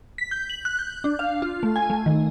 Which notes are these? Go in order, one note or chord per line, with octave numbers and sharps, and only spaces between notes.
B6
G6
F#7
F#6
G6
D4
F5
F4
A3
G#5
A3
D#3